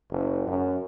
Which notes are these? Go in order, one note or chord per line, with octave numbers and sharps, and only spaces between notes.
F#1
F#2